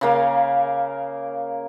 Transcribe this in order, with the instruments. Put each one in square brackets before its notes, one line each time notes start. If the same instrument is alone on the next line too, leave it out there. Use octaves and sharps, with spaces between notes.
[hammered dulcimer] C#3 A#3 F5